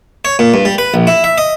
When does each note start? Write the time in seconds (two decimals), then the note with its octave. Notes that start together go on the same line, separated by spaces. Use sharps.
0.25 C#5
0.39 A#2
0.54 G2
0.65 G3
0.78 B4
0.94 A#1
1.07 E4
1.24 E5
1.38 D#5